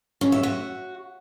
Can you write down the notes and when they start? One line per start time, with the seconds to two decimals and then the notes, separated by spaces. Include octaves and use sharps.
0.21 C#4
0.32 E5
0.43 F#4